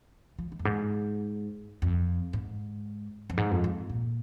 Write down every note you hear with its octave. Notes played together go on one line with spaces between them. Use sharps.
F3
D#3
F2
G#2
F2
G#2
F2
G#2
F2
G#2
A#2